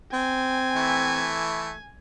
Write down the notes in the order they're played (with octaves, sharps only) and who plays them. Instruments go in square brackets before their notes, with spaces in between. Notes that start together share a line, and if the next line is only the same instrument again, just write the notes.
[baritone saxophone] C4 [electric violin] G#5
[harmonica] E3 A3